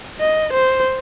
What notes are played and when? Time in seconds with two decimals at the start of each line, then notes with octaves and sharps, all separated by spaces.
0.20 D#5
0.53 C5